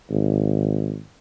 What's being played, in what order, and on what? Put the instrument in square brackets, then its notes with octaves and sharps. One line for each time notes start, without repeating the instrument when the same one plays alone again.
[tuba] G#1